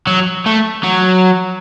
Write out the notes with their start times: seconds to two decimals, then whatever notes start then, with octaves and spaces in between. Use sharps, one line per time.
0.07 F#3
0.46 A3
0.83 F#3